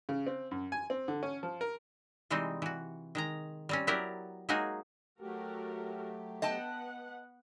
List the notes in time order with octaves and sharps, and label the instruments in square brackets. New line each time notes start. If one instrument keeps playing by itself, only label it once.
[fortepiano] C#3
C4
F#2
G#5
C4
D3
C#4
F3
A#4
[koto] C3 E3 G3 G#3 C4 D#4
E3 F#4
D#3 G#3 A#5
G3 C4 C#4
F#3 B3 E4 G4 A#4 D5
F#3 G#3 A#3 D#4 F#4 G#4
[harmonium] F#3 A3 G4 [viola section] F#4 A4 A#4
[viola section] B3 F#5 [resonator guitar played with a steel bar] D#5 G5 A5